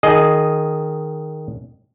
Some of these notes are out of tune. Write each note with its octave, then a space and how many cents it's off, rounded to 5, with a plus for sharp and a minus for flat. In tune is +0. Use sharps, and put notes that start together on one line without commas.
D#3 +0 G#4 +15 D#5 +0